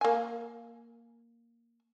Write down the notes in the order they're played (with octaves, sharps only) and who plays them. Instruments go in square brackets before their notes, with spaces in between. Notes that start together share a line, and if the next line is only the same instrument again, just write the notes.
[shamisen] A#3 G#5